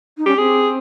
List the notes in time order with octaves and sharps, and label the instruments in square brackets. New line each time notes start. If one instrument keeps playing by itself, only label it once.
[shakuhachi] D#4
[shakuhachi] C#4 [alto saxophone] G4
[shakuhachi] C4 [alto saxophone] G#4